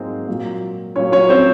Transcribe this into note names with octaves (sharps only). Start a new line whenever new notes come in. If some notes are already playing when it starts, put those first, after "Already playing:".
Already playing: G#2 F#3 G#3 A#3 C4
A#2 F#3 A#3
A#2 F#3 A#3 C#4 C#5
C#4 C#5
C4 C5